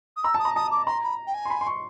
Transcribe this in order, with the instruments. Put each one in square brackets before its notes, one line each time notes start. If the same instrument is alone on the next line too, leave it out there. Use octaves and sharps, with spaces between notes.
[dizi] D#6
[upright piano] A#5 [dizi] E6
[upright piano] A5
[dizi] D#6
[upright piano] A#5
[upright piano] A5 [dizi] D#6
[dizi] D6
[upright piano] A#5 [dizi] C6
[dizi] B5
G5
G#5
[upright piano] C6
B5
C6
C#6